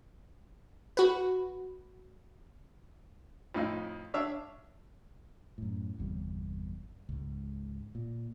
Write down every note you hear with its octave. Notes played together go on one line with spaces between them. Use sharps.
F#4 B4
F2 A2 D#4 F4
D4 C#5 E5 F5
F#2 A2
G1 E2 C3 G3
C#2 G#2
A#2